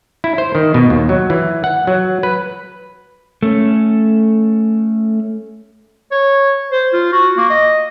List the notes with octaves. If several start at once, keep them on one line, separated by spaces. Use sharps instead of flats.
E4
C5
D#3
B2
D#2
F#3
E3
F#5
F#3
B4
A3 C#4
C#5
C5
F4
F#4
A#3
D#5